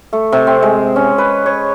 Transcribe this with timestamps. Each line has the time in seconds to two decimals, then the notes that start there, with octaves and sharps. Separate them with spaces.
0.13 A3
0.32 C3
0.47 C4
0.62 G#3
0.96 C#4
1.18 B4
1.46 C#5